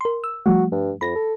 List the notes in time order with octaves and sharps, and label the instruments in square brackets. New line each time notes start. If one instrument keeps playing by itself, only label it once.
[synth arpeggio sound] A#4 C6
E6
[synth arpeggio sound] F3 G3 A3 [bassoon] F#4
[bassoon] G2
[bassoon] F2 [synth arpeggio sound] B5 A#6
[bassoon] A4